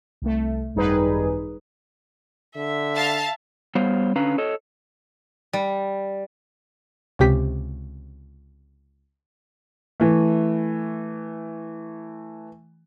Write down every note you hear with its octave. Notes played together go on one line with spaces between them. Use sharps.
C2 A3
G#1 F#2 G3 D#4 G#4 B4
D3 E5
F5 A5
G3 B3 C5 C#5 F5
D3 C#4 B4 F5 A#5
A4 C#5 D#5
G3
C#2 C3 G4 B6
E3 A3